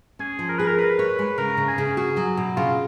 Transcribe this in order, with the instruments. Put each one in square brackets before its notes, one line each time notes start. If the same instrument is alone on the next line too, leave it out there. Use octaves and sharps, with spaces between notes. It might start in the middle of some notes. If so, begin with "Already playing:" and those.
[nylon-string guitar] C#4 [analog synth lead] G#4
[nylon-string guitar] F3
[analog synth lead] A#4
[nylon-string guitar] G#4 [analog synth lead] B4
[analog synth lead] A#4
[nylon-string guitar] A#4 [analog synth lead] B4
[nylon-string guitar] C#5
[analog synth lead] B4
[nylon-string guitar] G#3
[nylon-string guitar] C#3 [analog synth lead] A#4
[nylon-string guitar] C#3
[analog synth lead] G#4
[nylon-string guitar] C#3
[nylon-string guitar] F#4 [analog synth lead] G#4
[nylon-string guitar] F#3
B2
[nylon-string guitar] C#3 [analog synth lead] F4